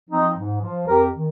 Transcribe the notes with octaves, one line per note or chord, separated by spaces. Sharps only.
F3 C4 D#4
G#2
F3
F2 G4 A#4
D#3